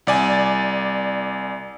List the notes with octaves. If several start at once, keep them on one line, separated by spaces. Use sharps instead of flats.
C2 D5 G#5